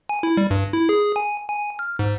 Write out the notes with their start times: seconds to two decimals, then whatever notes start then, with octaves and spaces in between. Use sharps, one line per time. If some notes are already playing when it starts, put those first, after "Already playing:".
0.09 G#5
0.23 E4
0.37 G3
0.51 G2
0.73 E4
0.89 G#4
1.16 G#5
1.48 G#5
1.79 F6
1.99 G#2